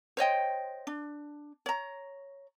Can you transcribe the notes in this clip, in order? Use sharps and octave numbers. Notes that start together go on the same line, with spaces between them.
C5 C#5 D#5 G5
D4
C#5 A#5